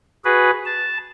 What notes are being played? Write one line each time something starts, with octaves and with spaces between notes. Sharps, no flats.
F#4 G#4 B4
A5